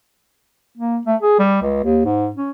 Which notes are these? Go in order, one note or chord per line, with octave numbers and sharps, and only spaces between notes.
A#3
A3
G#4
G3
C#2
D#2
G#2
C#4